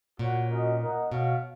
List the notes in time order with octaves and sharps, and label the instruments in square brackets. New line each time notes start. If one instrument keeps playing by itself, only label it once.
[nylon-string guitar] A#2 [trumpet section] F#4 C#5 F#5
[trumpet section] C#4 F#4 A#4 D#5
D#4 A#4 D#5 F#5
[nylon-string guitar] B2 [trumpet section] F#4 C#5 F5